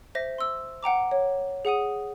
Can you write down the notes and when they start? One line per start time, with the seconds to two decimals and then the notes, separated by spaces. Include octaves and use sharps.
0.15 C5 E5 A#6
0.38 C6 E6
0.83 F#5 G5 A#5 D6
1.11 C#5
1.65 G#4 F#5 D#6 D#7